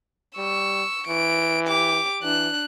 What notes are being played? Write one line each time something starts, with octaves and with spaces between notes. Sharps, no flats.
G3 C#6 E6
E3 D7
G4 D6
E3 D4 F#6